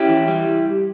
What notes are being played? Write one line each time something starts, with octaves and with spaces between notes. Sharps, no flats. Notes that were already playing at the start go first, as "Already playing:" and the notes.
Already playing: C#4 E4 G4
E3
G3